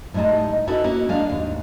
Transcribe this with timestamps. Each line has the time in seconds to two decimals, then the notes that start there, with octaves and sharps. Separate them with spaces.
0.14 A2 G3 G#3 D#4 A5
0.67 C#4 D#4 E4 F#4 A4 B4
0.84 A#3 C#4 F#4
1.09 G#3 D4 F5
1.30 D#2 G#2